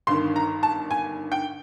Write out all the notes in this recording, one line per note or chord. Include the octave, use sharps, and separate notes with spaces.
G1 G2 D#3 C6
A#5
A5
G#5
G5